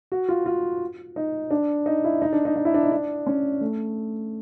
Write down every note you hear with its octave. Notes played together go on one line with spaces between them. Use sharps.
F#4
F4
F4
D#4
D4
D#4
E4
D#4
D4
D#4
D#4
E4
D4
D#4
D4
C#4
A3